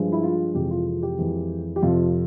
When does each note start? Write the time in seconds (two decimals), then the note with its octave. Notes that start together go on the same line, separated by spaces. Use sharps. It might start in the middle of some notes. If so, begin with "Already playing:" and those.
Already playing: G2 F3 G#3
0.12 E4
0.23 F4
0.54 F2 C3 E3 G#3 G4
0.71 F4
0.87 F4
1.03 G4
1.19 F2 E3 G#3
1.76 G4
1.82 F2 C3 F3 F4